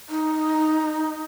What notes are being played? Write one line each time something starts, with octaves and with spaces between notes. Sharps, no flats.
D#4